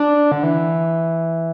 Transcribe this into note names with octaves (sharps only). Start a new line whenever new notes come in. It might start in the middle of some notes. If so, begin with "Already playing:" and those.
Already playing: D4
D3
E3